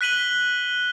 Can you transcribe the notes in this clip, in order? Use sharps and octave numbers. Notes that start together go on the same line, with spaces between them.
F#6 B6 D#7 F#7 G7